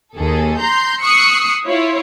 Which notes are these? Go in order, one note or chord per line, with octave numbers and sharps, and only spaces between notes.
D#2 G#4 A4
A#5 C6 G6
C#6 D#6 E6 F#6 C7 C#7
E4 F4 C#5